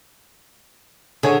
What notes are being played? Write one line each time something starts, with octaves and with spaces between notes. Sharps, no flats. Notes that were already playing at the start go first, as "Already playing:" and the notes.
D3 G#4 C#5 G#5